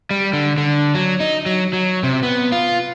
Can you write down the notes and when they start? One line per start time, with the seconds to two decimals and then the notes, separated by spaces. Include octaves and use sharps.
0.11 G3
0.33 D3
0.58 D3
0.95 F#3
1.20 D#4
1.46 F#3
1.73 F#3
2.03 C3
2.23 B3
2.52 F4